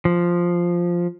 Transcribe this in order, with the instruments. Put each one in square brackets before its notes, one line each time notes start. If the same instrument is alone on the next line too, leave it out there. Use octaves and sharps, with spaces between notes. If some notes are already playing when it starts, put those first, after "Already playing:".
[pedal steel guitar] F3